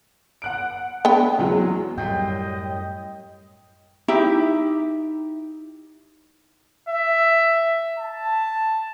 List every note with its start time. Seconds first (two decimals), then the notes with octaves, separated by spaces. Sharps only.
0.42 F#5 F#6 D7
1.05 B3 D4 G5
1.39 E2 F#3 G#3
1.98 F#2 A2 G3 D#5 G5
4.08 D#4 E4 G4 E5
6.89 E5
7.99 A5